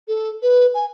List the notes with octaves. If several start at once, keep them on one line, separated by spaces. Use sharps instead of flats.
A4
B4
G#5